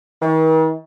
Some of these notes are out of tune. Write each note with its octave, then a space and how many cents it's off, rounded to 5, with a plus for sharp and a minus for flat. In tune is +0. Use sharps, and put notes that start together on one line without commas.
D#3 +45